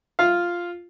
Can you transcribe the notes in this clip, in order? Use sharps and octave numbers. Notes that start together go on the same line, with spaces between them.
F4 F5